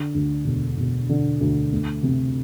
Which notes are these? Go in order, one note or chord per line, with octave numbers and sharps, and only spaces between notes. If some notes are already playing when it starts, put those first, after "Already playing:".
Already playing: D3
D2
E1
E1
D3
D2
A3
C3